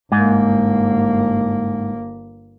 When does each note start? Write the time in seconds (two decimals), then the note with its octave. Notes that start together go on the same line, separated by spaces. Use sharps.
0.12 G1 G#2 A#3